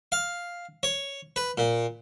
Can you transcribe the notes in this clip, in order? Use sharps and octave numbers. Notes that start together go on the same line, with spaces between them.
F5
C#5
B4
A#2